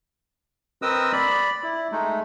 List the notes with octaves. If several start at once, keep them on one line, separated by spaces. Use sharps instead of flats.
C4 A#4 B4 D#5 D#6 E6
D5 B5
E4
G#3 A3 D#4